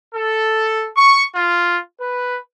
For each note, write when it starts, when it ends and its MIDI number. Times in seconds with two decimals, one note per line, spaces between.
0.14 0.86 69
0.96 1.22 85
1.35 1.76 65
1.99 2.37 71